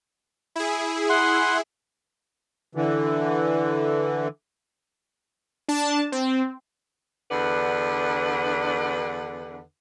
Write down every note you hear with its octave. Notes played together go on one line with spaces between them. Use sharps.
E4 G#4
F#5 C6
D3 E3
D4 A5
C4
E2 D3 D4 B4 F#5